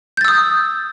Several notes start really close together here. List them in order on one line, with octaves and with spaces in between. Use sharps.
G6 A6 E6 D#6